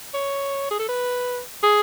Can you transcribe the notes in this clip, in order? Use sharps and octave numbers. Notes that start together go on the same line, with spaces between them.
C#5
G#4
A4
B4
G#4